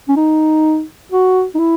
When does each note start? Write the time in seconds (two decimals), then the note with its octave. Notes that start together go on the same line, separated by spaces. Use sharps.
0.09 C#4
0.16 D#4
1.12 F#4
1.55 D#4
1.59 E4